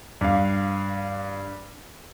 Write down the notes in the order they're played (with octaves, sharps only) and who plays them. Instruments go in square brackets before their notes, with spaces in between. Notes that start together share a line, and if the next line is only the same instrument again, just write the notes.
[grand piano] G2 F5